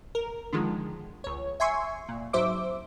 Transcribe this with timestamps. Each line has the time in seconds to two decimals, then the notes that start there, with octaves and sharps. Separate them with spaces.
0.15 A#4
0.53 D3 D#3 F3 G#3
1.24 C#2 C#5
1.60 E5 G#5 C6 C#6
2.09 A#2
2.33 G#1 F#3 C5 E5 D6